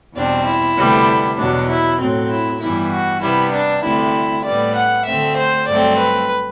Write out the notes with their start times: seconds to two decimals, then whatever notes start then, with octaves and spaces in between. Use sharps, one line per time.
0.14 E2 B2 G3 C4 D4
0.45 E4
0.76 D2 C3 G3 B3
1.37 E2 B2 F#3 D4
1.68 E4
1.98 A2 F#3 C4
2.30 E4
2.60 G2 E3 G3 B3 E4
2.92 F#4
3.21 C3 G3 B3 E4
3.52 D4
3.83 D2 C3 G3 E4
4.45 A2 G3 B3 D5
4.75 F#5
5.06 D2 D3 A3 C4 E5
5.37 C5
5.68 G2 F#3 A3 C4 D5
5.98 B4